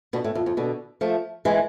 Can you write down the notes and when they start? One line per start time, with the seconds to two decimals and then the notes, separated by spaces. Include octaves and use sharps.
0.13 B2 D3
0.24 A2
0.35 F2
0.46 F2
0.57 B2 D3
1.01 F3 A3
1.45 E3 G#3